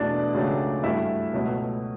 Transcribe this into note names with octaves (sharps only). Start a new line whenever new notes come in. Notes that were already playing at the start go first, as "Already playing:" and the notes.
Already playing: E2 B2 A3 D4 D5
C#2 C#3 F#3 A3
G2 F#3 A3 E4 E5
C#2 B2 F#3 A3